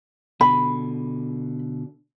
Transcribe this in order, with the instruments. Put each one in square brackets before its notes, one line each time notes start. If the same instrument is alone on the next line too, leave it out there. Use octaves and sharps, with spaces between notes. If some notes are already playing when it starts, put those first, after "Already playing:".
[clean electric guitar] B2 D3 [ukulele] B5